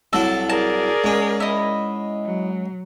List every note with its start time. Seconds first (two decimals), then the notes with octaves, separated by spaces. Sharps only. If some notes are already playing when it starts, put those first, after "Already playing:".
0.13 C2 F#3 E4 A4
0.49 G#4 A#4 D5 A5
1.04 G#2 C#4
1.40 E4 D#5
2.24 F#3